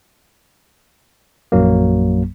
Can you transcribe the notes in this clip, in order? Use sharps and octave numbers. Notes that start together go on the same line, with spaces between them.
A#1 F#2 F#3 A#3